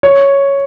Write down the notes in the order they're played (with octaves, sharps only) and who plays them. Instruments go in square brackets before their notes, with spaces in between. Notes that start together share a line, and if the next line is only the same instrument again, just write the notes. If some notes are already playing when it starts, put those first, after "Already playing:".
[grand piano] C#5